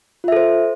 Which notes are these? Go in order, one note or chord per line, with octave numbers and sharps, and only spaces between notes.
F4 A4 C5 E5